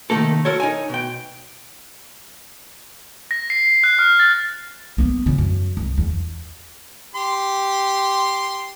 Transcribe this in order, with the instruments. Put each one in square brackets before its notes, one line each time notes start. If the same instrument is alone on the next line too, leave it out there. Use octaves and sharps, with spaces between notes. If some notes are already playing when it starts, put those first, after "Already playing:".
[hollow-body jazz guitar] C3 D#3 A3 A#3 A4
F#4 A4 A#4 C#5
D#4 C#5 G#5
B2 G5
[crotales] A#6
C7
F#6
F6
A6
[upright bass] A#3 B3
E2 C#3
F#2
C2
E2
[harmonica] G4 C6